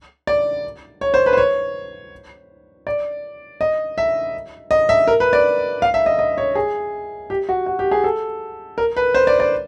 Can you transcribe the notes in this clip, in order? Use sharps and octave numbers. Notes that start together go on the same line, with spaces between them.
D5
C#5
C5
B4
C5
C#5
D5
D#5
E5
D#5
E5
A#4
B4
D5
F5
E5
D#5
D#5
C#5
G#4
G4
F#4
F#4
G4
G#4
A4
A#4
B4
C5
D5
D5